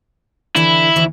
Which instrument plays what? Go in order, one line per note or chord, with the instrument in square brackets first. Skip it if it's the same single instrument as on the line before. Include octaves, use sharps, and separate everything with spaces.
[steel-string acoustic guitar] D3 E3 D4 [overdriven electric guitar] E4
[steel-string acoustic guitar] D2 E3